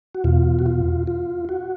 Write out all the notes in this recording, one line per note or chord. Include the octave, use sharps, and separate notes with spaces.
F#4
E2 B2 F4
F#4
F4
F4
F#4